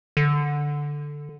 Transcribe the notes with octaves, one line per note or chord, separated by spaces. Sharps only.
D3